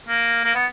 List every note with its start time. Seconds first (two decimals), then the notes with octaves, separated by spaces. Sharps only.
0.09 A#3
0.44 A#3
0.55 B3